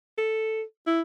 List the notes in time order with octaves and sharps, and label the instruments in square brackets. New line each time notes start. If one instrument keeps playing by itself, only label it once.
[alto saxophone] A4
E4